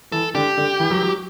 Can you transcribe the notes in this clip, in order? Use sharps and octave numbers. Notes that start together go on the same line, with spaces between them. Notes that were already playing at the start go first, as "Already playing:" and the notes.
E3 A4
D3 G4
D3
E3
F#3
F#3